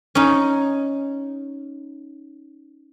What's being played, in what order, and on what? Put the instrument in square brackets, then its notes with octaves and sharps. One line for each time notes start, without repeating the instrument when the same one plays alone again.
[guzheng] C#4 D#4